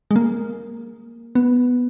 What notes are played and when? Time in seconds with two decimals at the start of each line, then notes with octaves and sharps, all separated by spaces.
0.11 G#3
0.16 A#3
1.35 B3